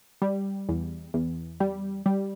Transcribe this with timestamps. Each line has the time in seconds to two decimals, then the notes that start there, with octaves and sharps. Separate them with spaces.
0.22 G3
0.69 E2
1.14 E2
1.60 G3
2.06 G3